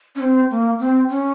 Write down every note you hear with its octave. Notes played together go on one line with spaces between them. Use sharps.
C#4
C4
A#3
C4
C#4